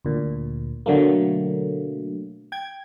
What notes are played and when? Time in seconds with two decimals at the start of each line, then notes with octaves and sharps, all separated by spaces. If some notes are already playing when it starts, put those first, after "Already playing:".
0.05 D2 A#2
0.86 B2 D3 F#3 A3 A#3
2.52 G5 G#6